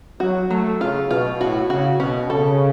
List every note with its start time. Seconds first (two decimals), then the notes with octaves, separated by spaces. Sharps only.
0.20 F#3 F#4
0.50 F#3 A3
0.80 C#3 F4
1.10 B2 F4
1.40 A2 F#4
1.69 C#3 F#4
2.00 B2 C#4
2.30 C#3 A4